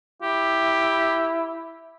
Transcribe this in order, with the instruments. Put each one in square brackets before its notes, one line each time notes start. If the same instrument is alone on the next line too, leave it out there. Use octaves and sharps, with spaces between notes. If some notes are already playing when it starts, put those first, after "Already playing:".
[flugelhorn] E4 [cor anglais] G4